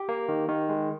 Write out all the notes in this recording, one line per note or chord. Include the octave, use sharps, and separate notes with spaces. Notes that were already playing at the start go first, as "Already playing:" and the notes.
Already playing: G4
A#3
D#3
D#3
G#3